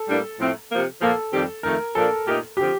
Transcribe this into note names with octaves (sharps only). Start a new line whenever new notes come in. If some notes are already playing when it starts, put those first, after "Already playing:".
Already playing: A4
A2 G3 A#3 D4
A2 F3 A3 C4
C3 F3 A#3
A#2 F3 A#3 A4
F2 D#3 G3 C4 G4
F2 D#3 A3 A#4
A#2 F3 A#3 D4 A4
A#2 A3 D#4 G4 A#4
D3 F3 C4 G4